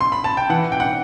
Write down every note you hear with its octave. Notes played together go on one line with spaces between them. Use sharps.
C6
B5
A5
G5
E3 F#5
G5
F#5